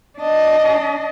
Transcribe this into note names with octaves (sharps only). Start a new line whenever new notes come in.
D4 D#5